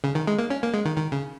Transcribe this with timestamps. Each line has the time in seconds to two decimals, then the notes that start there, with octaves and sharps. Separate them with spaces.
0.04 C#3
0.15 D#3
0.27 G#3
0.38 A#3
0.50 C#4
0.63 A#3
0.74 G#3
0.85 D#3
0.97 D#3
1.12 C#3